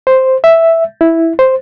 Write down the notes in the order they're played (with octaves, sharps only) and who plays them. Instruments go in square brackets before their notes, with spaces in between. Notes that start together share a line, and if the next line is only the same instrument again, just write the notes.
[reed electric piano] C5
E5
E4
C5